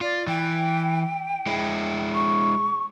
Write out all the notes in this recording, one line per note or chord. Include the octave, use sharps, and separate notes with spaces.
F4 D5
E3 G5
G#3 E4
C#6